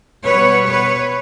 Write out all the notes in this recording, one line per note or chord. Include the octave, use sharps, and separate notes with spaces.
B2 G3 B3 B4 C#5
B4 C#5